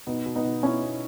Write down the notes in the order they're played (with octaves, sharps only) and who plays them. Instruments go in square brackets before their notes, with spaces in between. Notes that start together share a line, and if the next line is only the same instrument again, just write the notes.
[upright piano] B2 B3 D#4
B2
B3 D#4
B2
B2 C#4 E4
B2